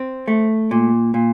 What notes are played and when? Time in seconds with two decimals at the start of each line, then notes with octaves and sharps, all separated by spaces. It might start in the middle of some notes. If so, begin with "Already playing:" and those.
Already playing: C4
0.28 A3
0.71 A#2
1.14 A#2